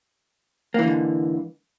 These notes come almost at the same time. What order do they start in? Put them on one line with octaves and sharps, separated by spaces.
A#3 E3 D3 G#2